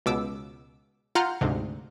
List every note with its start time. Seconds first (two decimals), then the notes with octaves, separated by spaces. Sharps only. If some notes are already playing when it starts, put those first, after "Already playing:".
0.06 C#2 B2 D6 E6
1.15 F4 F#5 A#5 C6 F6 G6
1.41 D2 G#2 C3